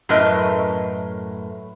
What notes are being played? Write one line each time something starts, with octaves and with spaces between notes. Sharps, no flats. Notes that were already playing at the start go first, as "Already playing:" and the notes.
F#2 A2 A3 A#4 B4 D#5